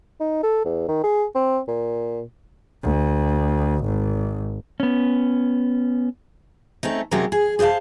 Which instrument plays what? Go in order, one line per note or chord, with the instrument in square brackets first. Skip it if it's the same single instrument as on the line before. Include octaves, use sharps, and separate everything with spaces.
[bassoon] D#4
A4
E2
D#3
G#4
C4
A#2
[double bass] D2
G#1
[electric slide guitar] B3 C#4
[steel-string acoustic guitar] A3 C4 C#4 D#4
C3 F#3 G#3 C4 C#4 A#4
G#4
G#4 C5 D5 F5 A5